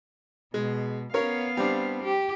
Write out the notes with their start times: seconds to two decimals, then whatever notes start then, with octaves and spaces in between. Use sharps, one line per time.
0.54 B2 G#3
1.14 B3 C#4 A#4 C#5 F5
1.57 G3 C4 D4
2.03 G4